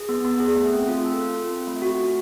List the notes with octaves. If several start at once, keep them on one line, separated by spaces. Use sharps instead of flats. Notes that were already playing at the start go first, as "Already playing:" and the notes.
Already playing: G#4
B3
B3
G#4
A3
C4
F4
A4
F4
F4
C4
A3
F#4
C#4